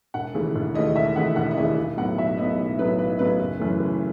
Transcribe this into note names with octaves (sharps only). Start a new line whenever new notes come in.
E1 F#5
D#2 C#3 E3 A3
E1
D#2 C#3 E3 A3 D#5
E1 E5
D#2 C#3 E3 A3 F#5
E1 F#5
D#5
D#2 C#3 E3 A3 E5
B1
A2 F#3 B3 F#5
B1 E5
A2 F#3 B3 D#5
B1
A2 F#3 B3 B4
B1 B4
A2 F#3 B3 B4
F#1
F#2 E3 A3
F#1